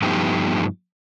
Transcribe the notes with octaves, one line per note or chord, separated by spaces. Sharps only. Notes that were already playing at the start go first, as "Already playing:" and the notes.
G2 F3 A3 B3 D#4 G4